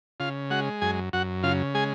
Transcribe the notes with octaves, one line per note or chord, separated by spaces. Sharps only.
C#3 F4 F5
G#3 F#4 F#5
F#2 G#4 G#5
F#2 F#4 F#5
C#3 F4 F5
G#3 G#4 G#5